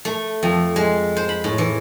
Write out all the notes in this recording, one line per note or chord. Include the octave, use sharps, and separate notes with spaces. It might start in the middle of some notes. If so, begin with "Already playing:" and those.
A3
F2
G#3
C5
B5
A2
E3